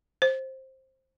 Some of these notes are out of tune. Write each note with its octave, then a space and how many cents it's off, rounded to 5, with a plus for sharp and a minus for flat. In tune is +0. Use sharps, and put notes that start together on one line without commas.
C5 +15